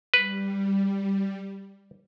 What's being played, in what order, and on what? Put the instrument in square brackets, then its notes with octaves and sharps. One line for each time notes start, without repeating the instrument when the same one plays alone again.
[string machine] G3 [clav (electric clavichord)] B4